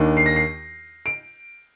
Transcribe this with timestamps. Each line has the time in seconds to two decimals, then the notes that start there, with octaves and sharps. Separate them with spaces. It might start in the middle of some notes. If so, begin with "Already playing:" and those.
Already playing: D#2 D#3 A#3 D4
0.17 C7
0.26 A#6
0.36 C7
1.06 D7